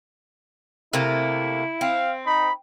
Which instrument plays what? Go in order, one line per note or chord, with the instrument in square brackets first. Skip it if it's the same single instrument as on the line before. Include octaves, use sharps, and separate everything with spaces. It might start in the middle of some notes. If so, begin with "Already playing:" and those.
[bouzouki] C3 A3 A#3 [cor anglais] E4
[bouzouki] C4 [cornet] F5
[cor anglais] D#4 [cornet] B5